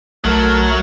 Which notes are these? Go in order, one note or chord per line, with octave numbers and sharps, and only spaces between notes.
B1 F#3 A3 A4 A#4 F6